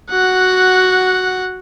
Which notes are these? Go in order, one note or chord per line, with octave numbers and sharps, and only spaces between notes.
F#4 F#5